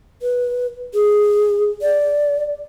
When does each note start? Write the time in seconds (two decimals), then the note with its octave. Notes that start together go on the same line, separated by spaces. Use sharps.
0.22 B4
0.94 G#4
1.82 D5